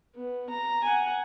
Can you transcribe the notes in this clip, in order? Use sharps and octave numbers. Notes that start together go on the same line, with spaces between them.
B3
A#5
F#5 G#5